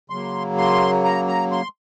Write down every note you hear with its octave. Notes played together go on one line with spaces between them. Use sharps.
C#3 F#3 A#3 C6
C6
A#5
A#5
C6